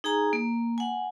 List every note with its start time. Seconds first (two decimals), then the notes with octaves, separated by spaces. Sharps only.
0.04 D#4 G#4 G#5 A#5
0.33 A#3
0.78 F#5 G#5